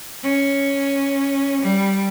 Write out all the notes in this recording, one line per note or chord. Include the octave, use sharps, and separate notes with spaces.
C#4
G3